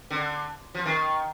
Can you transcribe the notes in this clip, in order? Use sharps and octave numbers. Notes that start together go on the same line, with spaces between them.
D3
F3
D#3